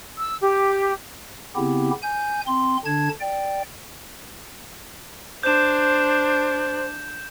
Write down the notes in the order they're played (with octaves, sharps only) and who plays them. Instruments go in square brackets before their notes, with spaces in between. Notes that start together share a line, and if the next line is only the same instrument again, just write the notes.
[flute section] E6
G4
[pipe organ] C#3 B3 C4 E4 G4
G#5 G6
C4 C6
D3 D4 A5 G#6
D5 G5
[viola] D4 [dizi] C5 [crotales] G6 E7